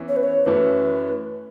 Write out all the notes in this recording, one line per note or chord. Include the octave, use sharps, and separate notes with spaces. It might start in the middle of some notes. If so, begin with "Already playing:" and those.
Already playing: E2 E3 C#4 E4
C#5
B4
C#5
F#2 E3 A3 C#4 E4 B4